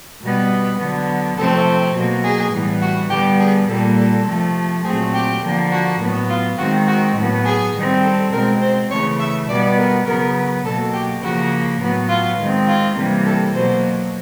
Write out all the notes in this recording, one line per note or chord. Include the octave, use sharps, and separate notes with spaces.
B2 G3 B3
D3 F#3 B3
C3 F3 A3 C4 A4
B2 F#3 A#3
G#4
A2 E3 G3 B3
F#4
D3 G3 B3 G4
G#4
A#2 G3 A#3 A4
A4
C3 F3 A3
A#2 F#3 A3 C4 G#4
G4
D3 F3 A#3
F#4
A2 F#3 B3
F4
D#3 G#3 C4 F#4
F#4
A2 F#3 B3
G#4
D#3 G3 C4
A4
B2 G#3 C4 A#4
C5
C#3 E3 A3 C#5
E5
B2 G3 B3 D5
A#4
C#3 F#3 B3 A#4
B2 F#3 A#3 A4
G4
C#3 F3 A#3 F#4
A2 F#3 B3
F4
D#3 G#3 C4
F4
C3 E3 G3 A#3
A4
B2 F#3 A#3 C5